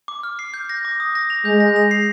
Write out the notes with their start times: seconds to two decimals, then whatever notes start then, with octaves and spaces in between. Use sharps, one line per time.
0.08 D6
0.23 F6
0.39 C7
0.54 G6
0.69 A#6
0.85 D6
1.00 D#6
1.15 A#6
1.30 F7
1.45 G#3 G6
1.60 A#6
1.76 F7
1.91 C7